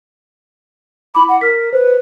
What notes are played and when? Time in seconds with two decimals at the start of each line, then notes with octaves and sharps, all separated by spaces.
1.15 E4 B5 D6
1.29 F#5
1.41 A#4 F6 B6
1.73 B4 C5